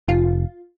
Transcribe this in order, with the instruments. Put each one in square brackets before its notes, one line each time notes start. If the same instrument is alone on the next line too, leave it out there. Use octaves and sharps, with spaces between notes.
[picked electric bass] F1 [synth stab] F4